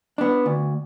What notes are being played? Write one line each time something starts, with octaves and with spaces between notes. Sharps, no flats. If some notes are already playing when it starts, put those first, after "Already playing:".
B3 D4
D2